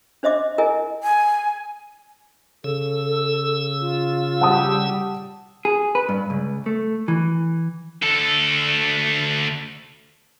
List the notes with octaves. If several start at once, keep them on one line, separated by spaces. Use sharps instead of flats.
D4 C5 D#5 E5 D6
E4 A#4 D#5 G#5
G#5
C#3 A4 E6
F4
G3 G4 F#5 A5 D#6
G#4
B4
G2
C#2
A3
E3
D2 A4